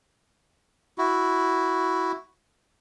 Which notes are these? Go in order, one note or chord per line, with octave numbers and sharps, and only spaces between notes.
E4 F#4